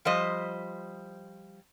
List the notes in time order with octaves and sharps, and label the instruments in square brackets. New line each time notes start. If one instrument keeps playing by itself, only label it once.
[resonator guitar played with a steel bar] F3 G3 C5 D#5